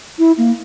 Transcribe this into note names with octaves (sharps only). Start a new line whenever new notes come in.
E4
A#3